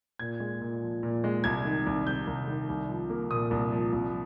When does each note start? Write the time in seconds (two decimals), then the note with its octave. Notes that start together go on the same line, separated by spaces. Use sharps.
0.19 A#2 G#6
0.40 G#3
0.62 A#2
0.82 F3
1.03 A#2
1.24 G#3
1.44 C2 G#6
1.65 D#3
1.86 C2
2.07 C3 G6
2.27 C2
2.47 D#3
2.69 C2
2.89 F3
3.10 A#3
3.31 A#2 D#6
3.51 C2
3.72 F3
3.93 C2